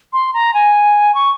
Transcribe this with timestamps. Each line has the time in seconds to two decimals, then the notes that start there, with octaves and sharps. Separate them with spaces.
0.13 C6
0.34 A#5
0.54 G#5
1.15 C#6